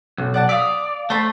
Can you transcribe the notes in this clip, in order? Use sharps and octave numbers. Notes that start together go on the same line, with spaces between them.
B1
D5 F#5 A5
D5 E5 F5 D#6
A3 C5 A5 B5